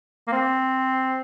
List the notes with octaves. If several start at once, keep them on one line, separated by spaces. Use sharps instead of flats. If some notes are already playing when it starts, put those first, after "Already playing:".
A#3
C4